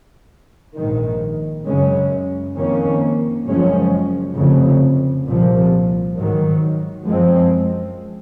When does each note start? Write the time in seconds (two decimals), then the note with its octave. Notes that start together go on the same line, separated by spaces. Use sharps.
0.77 A#1 G#2 D#3
1.67 F#2 C#3 G#3 C#4
2.57 F2 D#3 A#3 C#4
3.47 F#1 F#2 F3 G#3 C#4
4.37 F1 F2 C#3
5.27 C2 A#2 F3
6.17 G#2 D#3 F#3
7.07 F#2 F3 G#3 C4